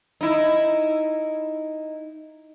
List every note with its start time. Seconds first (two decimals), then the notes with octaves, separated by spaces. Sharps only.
0.21 D#4 E4